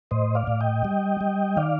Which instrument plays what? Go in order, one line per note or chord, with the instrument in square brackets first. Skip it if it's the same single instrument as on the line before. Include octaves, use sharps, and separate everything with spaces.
[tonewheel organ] A2 C5 D#5
D5 F5
A2
D#5 G5
G3
G3
D#3 D5 F5